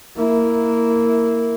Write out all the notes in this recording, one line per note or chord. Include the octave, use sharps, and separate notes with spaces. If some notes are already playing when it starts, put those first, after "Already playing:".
A#3 E4